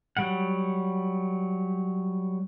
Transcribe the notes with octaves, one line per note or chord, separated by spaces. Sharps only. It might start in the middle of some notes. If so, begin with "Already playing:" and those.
F#3 G3 F#5